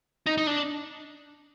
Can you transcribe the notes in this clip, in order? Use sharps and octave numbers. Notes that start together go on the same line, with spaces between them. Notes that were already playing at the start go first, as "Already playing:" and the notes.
D#4
D#4
D4